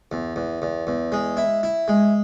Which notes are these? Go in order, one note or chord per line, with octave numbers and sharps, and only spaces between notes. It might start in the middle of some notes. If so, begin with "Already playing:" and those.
E2
E2
E2
E2
G#3
E4
E4
G#3